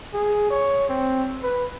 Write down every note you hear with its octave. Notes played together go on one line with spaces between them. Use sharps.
G#4
C#5
C4
B4